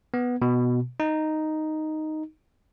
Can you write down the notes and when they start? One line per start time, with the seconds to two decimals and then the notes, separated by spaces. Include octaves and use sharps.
0.14 B3
0.42 B2
1.00 D#4